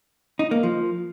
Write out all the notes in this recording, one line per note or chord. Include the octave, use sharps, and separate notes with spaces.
D#4
A#3
F3